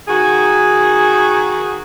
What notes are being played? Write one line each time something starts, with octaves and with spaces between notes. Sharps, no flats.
D#3 F#4 G#4